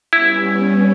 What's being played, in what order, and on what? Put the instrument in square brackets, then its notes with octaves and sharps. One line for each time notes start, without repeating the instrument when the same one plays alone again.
[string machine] G3 B3 C#4 [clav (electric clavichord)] E4